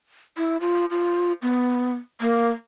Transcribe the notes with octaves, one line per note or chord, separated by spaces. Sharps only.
E4
F4
F4
B3
A#3